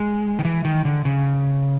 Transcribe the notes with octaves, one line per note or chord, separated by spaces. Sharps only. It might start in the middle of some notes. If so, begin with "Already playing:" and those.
Already playing: G#3
D#3
E3
D#3
D3
C#3